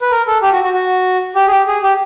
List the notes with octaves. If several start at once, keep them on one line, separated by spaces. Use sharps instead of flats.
B4
A#4
A4
G4
F#4
F#4
F#4
G4
G#4
G4
G#4
G4